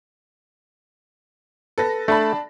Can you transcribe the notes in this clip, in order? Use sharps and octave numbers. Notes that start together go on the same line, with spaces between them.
A4 B4 A#6
A3 D4 A5 B5